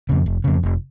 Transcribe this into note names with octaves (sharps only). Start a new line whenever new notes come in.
F2 C#3
F1
F2 C#3
F1